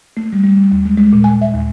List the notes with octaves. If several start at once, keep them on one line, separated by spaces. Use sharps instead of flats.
A3
G3
G3
G3
D#2
G#3
G#3
A#2
G#5
E5
D#2